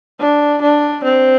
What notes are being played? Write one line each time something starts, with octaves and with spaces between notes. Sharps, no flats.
D4
D4
C4